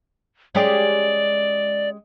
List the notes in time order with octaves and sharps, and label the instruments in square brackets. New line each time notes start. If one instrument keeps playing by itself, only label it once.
[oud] G#3 C#4 G4 [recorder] D5